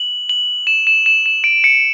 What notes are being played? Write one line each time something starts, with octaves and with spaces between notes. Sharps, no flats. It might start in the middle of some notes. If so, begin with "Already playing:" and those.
Already playing: F#7
F#7
E7
E7
E7
E7
D7
C#7